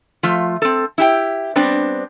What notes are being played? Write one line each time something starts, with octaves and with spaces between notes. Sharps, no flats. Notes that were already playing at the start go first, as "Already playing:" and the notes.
F3 A3 F4
C4 A4
E4 G4 G5
G3 B3 C4 D4